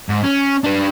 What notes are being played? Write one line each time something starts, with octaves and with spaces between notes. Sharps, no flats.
G#2
C#4
D4 B4